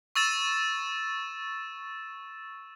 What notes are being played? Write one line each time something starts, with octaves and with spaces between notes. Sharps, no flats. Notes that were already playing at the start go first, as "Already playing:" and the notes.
C#6 E6 A6 E7